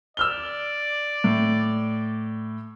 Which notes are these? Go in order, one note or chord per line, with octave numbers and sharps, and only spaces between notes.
D5 E6 F6 G7
A2